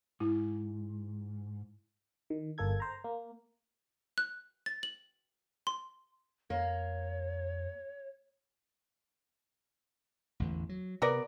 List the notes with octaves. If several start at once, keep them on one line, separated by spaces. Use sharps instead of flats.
G#2 E4
D#3
G1 A#3 A4 G#6
C5 A#5
A#3
F#6
A6
F#7
C6
F2 A#3 C#5
A1 E2 D3
F#3
C3 B3 A#4 D5